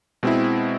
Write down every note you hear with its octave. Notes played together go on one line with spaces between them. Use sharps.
B2 G#3 C4 E4